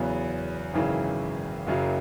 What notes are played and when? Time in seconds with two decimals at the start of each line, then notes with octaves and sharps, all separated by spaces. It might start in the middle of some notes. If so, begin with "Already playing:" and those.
Already playing: E2 C#3 F#3 B3
0.74 G#1 F#2 C#3 E3
1.67 F#1 F#2 C#3 F#3